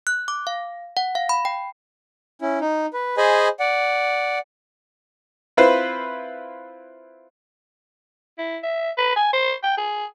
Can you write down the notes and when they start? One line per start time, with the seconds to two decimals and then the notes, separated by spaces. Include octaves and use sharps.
0.07 F#6
0.28 D6
0.47 F5
0.97 F#5
1.15 F5
1.29 B5
1.45 G5
2.42 C#4 E4
2.61 D#4
2.93 B4
3.17 G#4 C5 D#5 G#5 B5
3.60 D5 F#5
5.57 C4 E4 F4 B4 C5
8.38 E4
8.63 E5
8.98 B4
9.16 G#5
9.33 C5
9.63 G5
9.78 G#4